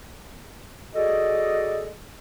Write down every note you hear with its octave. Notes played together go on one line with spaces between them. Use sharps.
F#4 G#4 A4 D5 D#5